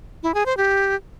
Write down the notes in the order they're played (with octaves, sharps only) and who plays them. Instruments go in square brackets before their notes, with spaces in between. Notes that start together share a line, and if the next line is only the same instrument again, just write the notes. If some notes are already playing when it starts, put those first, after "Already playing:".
[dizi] E4
G#4
C5
G4